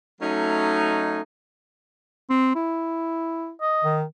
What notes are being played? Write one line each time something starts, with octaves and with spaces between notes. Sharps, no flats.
F#3 A3 C#4 D#4
C4
E4
D#5
D#3